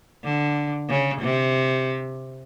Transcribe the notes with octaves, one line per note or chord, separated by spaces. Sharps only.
D3
C#3
C3